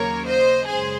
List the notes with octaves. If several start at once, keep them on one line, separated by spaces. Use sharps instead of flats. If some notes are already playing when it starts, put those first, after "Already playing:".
Already playing: D#2 C#3 F#3 A#3 A#4 C#5
C5 D#5
F#2 C#3 G#3 G#4 C5